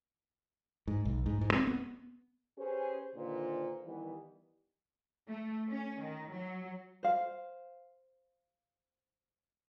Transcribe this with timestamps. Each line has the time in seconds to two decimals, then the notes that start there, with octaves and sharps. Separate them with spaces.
0.88 G#2
1.05 B1
1.26 G#2
1.41 G#2
1.53 C4
1.67 B3
2.58 C#4 G4 G#4 B4 C5
3.15 A#2 D3 D#3 F4 B4 C5
3.86 D#3 E3 G3 B3
5.29 A3
5.69 C#4
6.01 D#3
6.31 F#3
7.03 C5 F5